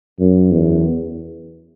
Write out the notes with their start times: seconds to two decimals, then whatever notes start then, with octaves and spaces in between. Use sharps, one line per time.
0.19 F#2
0.51 E2